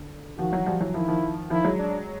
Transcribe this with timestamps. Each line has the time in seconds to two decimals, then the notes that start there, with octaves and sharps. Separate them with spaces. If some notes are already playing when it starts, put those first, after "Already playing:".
Already playing: D3
0.38 D#3 F3 F#4
0.52 E3 F#3
0.66 F3 G3
0.80 E3 F#3
0.94 D#3 F3 E4
1.08 D#3 F3
1.50 D#3 F3 E4
1.64 F#3 G#3
1.79 D4